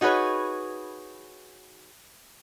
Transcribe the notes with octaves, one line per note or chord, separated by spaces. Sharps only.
D#4 F#4 G#4 B4 C#5